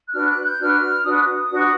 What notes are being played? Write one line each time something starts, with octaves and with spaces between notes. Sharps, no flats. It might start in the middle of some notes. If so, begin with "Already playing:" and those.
F#6
D4 F#4 B4 F6
F#6
G6
D4 F#4 B4 F6
D4 F#4 B4 D#6
D4 F#4 B4